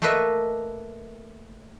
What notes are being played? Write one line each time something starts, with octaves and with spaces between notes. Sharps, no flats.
A3 A#3 A4 B4 D#5 E5